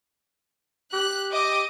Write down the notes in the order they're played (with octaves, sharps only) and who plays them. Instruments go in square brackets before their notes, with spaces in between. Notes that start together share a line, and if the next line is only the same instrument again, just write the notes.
[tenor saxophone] G4 [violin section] F#6
[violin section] D#5 [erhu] D6